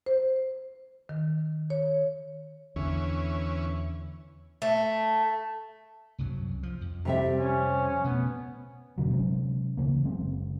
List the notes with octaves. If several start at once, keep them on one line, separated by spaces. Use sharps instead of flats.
C5
D#3
C#5
E2 D3 E3 C#4
A3
C2 F#2 F#3
F3
F2
C3 G3 E5
C#4
B2 A3 B3
F#1 B2 D3 F#3
C3 F#3 G#3 C#4
C#3 E3 A#3
F#1 F#2 G#3 C4